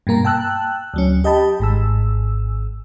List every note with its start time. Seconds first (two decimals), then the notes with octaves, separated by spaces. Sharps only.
0.07 G2 B2 A#3 A#5
0.25 G5 A5 E6 F#6
0.94 D2 F#3 C#4
1.24 G4 D#5 G5 A5 B5
1.59 G#1 G#2 E6